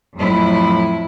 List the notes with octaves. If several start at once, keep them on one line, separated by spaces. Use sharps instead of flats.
F2 A2 F#3 E4